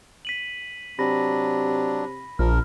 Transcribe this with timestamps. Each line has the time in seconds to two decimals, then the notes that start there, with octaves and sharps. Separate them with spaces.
0.25 B6 D#7 F#7
0.99 C3 F#3 D4 B5 A#6
2.39 A#1 F3 A#4 F6